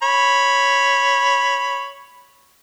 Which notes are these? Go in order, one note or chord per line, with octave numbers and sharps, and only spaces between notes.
C#5 B5